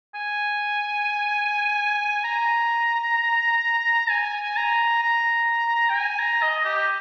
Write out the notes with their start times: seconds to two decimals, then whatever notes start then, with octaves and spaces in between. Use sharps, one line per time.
0.15 G#5
2.24 A#5
4.10 G#5
4.56 A#5
5.03 A#5
5.89 G5
5.95 G#5
6.19 A#5
6.42 D#5
6.65 G4